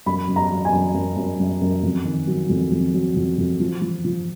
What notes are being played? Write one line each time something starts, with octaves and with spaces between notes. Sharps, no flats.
F#2 B5
F#2
A#5
F#3
G#5
F#2
F#2
F#2
F#2
F#2
F2
D#3
F#3
F2
F2
F#3
F2
F2
F3
F3
F3